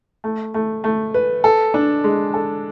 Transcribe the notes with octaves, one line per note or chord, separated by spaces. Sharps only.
A3
A3
A3
B4
A4
D4
G#3
A4